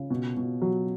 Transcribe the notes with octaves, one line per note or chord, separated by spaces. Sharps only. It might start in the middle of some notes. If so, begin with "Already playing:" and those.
Already playing: C#3
B2
B2
F#3